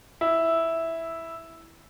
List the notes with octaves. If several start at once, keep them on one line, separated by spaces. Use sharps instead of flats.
E4